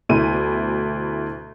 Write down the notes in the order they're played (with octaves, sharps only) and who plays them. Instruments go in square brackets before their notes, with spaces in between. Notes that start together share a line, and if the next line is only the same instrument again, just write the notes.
[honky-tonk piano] D2 B2 E4 D#7